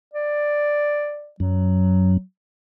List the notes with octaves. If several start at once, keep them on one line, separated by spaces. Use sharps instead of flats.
D5
F#2 F#3